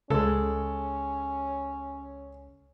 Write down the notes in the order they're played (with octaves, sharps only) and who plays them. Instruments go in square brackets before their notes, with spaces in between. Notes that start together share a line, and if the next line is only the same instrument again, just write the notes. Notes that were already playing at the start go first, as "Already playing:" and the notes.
[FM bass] C#2 [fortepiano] G#3 A4 [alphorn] C#4